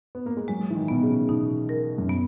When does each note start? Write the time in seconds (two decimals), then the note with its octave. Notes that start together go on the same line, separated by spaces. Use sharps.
0.15 B3
0.26 A#3
0.37 G#3
0.48 F#3 G#3
0.70 E3
0.75 D#3
0.88 B2 B3
1.03 C#3
1.29 B2 D#4
1.69 A#4
1.98 F#2
2.09 B3